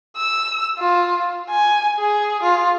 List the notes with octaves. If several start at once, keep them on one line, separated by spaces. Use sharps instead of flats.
E6
F4
G#5
G#4
F4